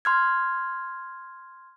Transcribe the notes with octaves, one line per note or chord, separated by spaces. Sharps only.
C6 F6 G#6